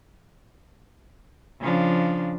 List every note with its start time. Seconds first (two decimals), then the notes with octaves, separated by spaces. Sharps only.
1.61 C#3 F3 D4